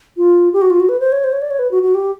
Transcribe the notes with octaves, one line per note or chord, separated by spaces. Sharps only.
F4
G4
F#4
F4
F#4
B4
C5
C#5
C5
C#5
D5
C#5
B4
F#4
F#4
G4